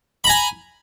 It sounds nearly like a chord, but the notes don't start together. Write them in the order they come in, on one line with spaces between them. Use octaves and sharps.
B5 A#5 G#5